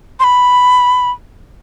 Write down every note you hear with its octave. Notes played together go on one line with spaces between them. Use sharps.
C6
B5